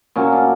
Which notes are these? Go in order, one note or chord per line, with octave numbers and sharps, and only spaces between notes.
A#2 F#3 C#4
D4